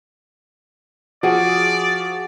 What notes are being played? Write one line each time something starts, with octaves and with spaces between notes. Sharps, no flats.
F3 F#4 G#4 D5